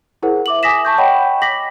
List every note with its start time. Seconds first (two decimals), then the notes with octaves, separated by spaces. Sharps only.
0.22 E4 G#4 A#4 C5 F#5
0.46 E5 D6 F#7
0.63 G#5 D6 D#6 A#6 B6 E7
0.85 A5 C#6 G6
0.98 C#5 D#5 F#5 G5 B5 C#6
1.42 D6 A#6 B6 F#7